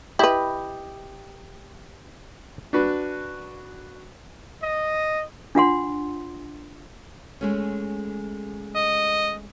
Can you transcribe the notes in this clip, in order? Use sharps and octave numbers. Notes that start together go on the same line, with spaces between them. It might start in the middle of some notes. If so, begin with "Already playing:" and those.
E4 G4 B4 D#5
D4 F#4 B4
D#5
D4 F4 F#5 C6
G#3 A3 C#4
D#5